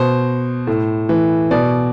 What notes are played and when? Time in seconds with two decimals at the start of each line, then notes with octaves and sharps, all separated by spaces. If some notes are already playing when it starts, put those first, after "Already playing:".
Already playing: B2 C5
0.67 A2
1.09 E3
1.51 B2 D5